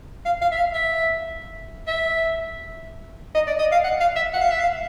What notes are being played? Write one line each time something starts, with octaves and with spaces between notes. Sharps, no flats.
F5
F5
E5
F5
E5
E5
D#5
D5
D#5
F5
F#5
F5
E5
F#5
F5
E5
F5